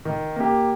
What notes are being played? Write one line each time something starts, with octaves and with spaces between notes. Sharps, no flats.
D#3
A#3 G4